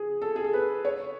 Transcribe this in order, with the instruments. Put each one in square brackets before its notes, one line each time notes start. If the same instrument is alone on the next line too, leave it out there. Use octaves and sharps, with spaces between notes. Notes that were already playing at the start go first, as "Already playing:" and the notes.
Already playing: [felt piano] G#4
A4
G#4
A4
B4
C#5